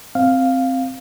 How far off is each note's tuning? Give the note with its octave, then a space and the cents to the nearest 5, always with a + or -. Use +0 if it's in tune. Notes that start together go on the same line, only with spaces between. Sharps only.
C4 +0 F5 +0